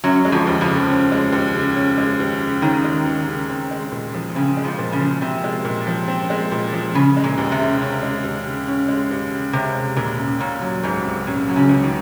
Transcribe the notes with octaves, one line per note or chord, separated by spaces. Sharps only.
F#2 F#3 C#4
G#3
F2 F3
D#2
F2 F3
C#3
C#4
G#3
D#2
C#3
C#4
G#3
D#2
C#3
D#3 C#4
G#3
D#2
C#3
C4
G#3
A#2
F3
C#3 C4
G#3
F2 F3
A#2
C#3
F3
C3 C4
G#3
A#2
F3
C4
G#3
A#2
F3
C#3 C#4
G#3
A#2
D#2
C3
C#3
C#4
G#3
D#2
C#3
C#4
G#3
D#2
C#3
C3 C#4
G#3
D#2 A#2
C#3
A#2 C#4
F#3
C#2 G#2
C3
A#2 C#4
F#3
C#3
C#2
D#3